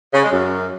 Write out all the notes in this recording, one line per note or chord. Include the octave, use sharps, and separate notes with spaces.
C#3
G#3
F#2